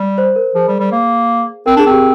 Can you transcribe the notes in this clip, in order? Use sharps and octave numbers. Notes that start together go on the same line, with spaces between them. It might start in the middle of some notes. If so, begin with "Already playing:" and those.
Already playing: G3
C5
A#4
F3 G#4
G3
G3
A#3
C4 A#4
D4 G#4
C4 G4